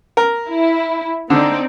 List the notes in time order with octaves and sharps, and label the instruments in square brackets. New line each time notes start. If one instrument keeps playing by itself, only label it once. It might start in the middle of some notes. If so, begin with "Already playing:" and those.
[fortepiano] A#4
[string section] E4
[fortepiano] D3 [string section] C4 D#4 D5